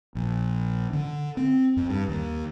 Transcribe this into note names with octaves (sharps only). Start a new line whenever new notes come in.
A#1
D3
C4
F2
G2
D#2